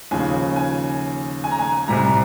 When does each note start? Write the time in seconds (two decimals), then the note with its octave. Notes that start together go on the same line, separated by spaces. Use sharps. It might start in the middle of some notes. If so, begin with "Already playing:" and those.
0.11 D#2 C#3 F3 G#5
0.56 G#5
1.44 G#5
1.51 A#5
1.59 G#5
1.88 C2 C3 G3 A#5